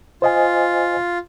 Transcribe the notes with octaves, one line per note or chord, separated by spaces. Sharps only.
F4 C5 D#5 G#5